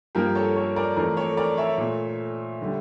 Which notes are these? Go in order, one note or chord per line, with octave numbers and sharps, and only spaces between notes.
G2 F3 A#3 G4 A#4
A4 C#5
A4 C#5
A#4 D5
F2 E3 A3 A#4 D5
A4 C#5
A#4 D5
C#5 E5
A#2 A3
D3 G3